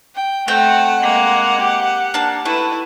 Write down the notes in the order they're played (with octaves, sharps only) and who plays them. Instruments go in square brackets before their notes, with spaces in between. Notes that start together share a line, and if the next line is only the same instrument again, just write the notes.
[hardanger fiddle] G5
[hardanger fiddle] A3 [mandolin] C4 G5 [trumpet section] F#5
[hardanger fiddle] G#3 A#3
G4
[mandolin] A#3 D4 A5
[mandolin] A3 [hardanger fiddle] E4 B4